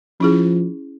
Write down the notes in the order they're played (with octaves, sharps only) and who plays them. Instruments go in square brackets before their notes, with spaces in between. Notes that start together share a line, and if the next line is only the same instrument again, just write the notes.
[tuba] F3 [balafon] C#4 E4 G#4